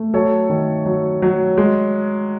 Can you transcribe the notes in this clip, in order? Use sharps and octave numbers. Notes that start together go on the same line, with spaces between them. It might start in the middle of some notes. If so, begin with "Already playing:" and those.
Already playing: A3
F#3 A4 C#5
D#3
F#3
F#3
G#3